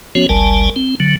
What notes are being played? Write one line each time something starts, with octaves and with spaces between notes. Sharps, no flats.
F3 B3 C#4 F#4 C#5
G1 C#2 G3 A#4 G#5 A5
C4
D3 F#3